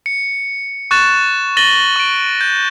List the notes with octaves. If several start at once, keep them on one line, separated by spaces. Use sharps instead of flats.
C#7
C#6 F#6 A6 E7
A6 A#6 D#7 F#7 G7
C#6 D7
G6